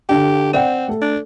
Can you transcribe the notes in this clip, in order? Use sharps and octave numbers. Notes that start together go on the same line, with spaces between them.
D3 D4 G4
C4 D5 F#5 G5
A3 A4
D4